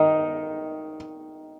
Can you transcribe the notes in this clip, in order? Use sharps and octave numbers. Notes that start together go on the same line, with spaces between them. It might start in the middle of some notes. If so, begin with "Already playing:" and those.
Already playing: D#3 D#4